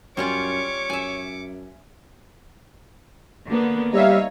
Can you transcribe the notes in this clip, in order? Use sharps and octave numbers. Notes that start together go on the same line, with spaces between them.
F#2 G3 C#4 F4 C#5 D6 C#7
F#2 E5 G#5
D3 A#3 B3
G3 D#4 C#5 E5 F5